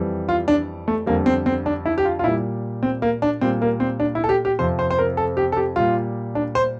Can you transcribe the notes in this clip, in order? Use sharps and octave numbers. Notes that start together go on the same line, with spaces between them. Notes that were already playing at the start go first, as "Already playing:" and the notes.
Already playing: F2 E3 G3
F4
D4
A3
F2 D3 G3 A#3
C4
C4
D4
E4
G4
F4
F4
A#2 G3 E4
C4
A#3
D4
A#2 G3 C4
A#3
C4
D4
E4
A4
G4
G4
F2 C3 F3 C5
C5
C5
A#4
A4
G4
A4
G4
A#2 G3 F4
D4
C5